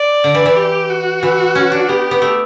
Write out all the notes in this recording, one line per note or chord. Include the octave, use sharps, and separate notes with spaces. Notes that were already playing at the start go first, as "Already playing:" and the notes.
Already playing: D5
D3
E3
E3
G4
F#4
E3
C#4
D4
B3 G4
B3
A3